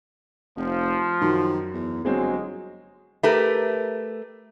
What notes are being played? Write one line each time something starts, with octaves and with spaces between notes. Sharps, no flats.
F1 F3
F#2 D#3
E2
G1 F#3 G#3 C4 G#4
A3 G4 A#4 B4